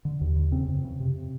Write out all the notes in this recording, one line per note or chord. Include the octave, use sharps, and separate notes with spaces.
D3
D#2
D3
C#3 C4
F2
C#3
C3